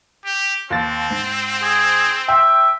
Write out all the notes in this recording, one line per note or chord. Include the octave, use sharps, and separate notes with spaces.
G4
D#2 C4 A6
G#2
G#4
E5 G5 C6